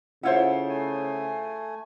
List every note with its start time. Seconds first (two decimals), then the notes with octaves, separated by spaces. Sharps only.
0.23 C#3 E4 F4 A4 C5 C#5 F#5
0.69 A3 G#5